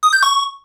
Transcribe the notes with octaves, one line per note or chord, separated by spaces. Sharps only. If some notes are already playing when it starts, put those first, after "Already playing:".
D#6
G6
C#6